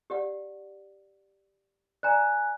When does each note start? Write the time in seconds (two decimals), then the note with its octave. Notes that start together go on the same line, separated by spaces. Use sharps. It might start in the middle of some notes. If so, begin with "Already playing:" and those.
0.10 G4 D5 F#5
2.03 D5 G#5 A#5 F#6